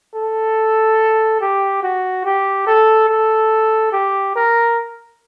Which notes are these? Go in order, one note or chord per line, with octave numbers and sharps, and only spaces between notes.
A4
G4
F#4
G4
A4
A4
G4
A#4